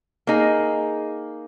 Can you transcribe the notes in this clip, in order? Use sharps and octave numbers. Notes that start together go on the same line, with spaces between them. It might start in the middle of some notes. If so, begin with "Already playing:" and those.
A#3 D#4 G#4